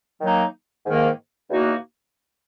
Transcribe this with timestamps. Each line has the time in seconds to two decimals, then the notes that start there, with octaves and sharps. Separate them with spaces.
0.20 D#3 F#3 A#3 D#4
0.85 G#2 D#3 A#3
1.50 E2 B2 A#3 D#4 F#4